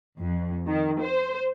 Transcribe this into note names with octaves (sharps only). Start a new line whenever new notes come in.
F2
D#3
C5